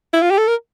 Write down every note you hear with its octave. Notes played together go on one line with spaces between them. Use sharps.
E4
F4
G4
A4
A#4